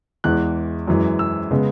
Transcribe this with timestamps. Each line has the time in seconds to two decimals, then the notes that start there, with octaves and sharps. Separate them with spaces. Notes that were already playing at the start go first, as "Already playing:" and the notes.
0.24 E2 E3 G#3 F#6
0.87 F#2 E3 G#3
1.19 E6
1.51 C#3 G#3 B3